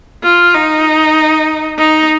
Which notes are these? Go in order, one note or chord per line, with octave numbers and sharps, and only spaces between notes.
F4
D#4
D#4